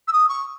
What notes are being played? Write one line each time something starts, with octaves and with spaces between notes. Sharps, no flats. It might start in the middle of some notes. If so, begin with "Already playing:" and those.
E6
D#6
C#6